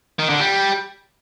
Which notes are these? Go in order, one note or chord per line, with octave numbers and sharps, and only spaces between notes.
D#3
D3
G3